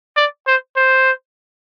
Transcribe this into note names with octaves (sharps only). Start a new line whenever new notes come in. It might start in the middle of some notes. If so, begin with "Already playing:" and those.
D5
C5
C5